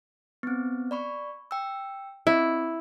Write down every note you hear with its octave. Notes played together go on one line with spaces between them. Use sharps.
B3 C4
D5 B5 C#6
G5 E6
C4 E4